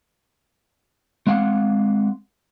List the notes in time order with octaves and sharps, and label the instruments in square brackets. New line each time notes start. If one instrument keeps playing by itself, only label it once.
[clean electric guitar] G#3 C4 F5 F#5